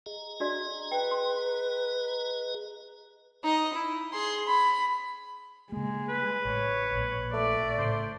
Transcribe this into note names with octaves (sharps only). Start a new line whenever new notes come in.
G#4 D#5 A#5
D4 F#4 D5
B4 G5
C6
D#4 D#5
E4
G#4 C6
B5
C#3 G#3 A#3
B4
A1 C#5
A#1 A#2
A3 D5
A2 C#3 C5